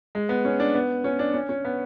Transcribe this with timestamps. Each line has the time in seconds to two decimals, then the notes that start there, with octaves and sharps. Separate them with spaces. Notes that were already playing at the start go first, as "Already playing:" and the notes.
0.15 G#3
0.29 B3
0.45 C#4
0.60 D4
0.74 B3
1.04 C#4
1.19 D4
1.34 C#4
1.49 C#4
1.65 B3